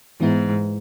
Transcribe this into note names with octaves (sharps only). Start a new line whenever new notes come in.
G#2 E3 B3 E4